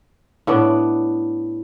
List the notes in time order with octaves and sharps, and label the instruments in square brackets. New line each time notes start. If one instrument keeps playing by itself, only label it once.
[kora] A2 B3 D4